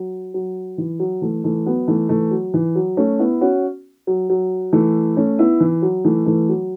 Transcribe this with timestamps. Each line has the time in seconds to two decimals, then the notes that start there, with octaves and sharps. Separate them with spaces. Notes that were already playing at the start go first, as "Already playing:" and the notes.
Already playing: F#3
0.34 F#3
0.78 E3
0.99 F#3
1.22 E3 A3
1.44 E3 A3
1.66 F#3 B3
1.88 E3 A3
2.09 E3 A3
2.31 F#3
2.54 E3
2.75 F#3
2.97 A3 C#4
3.19 B3 E4
3.41 C#4 F#4
4.07 F#3
4.30 F#3
4.73 E3 A3
5.17 A3 C#4
5.39 B3 E4
5.60 E3
5.82 F#3
6.04 E3 A3
6.26 E3 A3
6.49 F#3